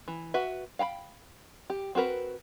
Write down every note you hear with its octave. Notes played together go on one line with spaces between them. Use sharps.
E3
F#4 B4 E5
F5 G5 A#5 B5
G4
C4 F#4 A#4 B4